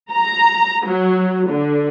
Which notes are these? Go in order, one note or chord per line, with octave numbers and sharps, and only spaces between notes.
A#5
F#3
D3